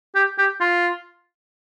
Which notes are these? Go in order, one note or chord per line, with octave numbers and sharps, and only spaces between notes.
G4
G4
F4